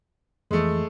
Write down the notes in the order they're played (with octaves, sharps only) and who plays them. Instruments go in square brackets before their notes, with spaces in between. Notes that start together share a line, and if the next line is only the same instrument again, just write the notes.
[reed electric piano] F2 E3 [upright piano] G#3 A3